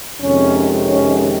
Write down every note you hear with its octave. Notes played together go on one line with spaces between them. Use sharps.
F2 C3 D#3 G#3 C#4
C#4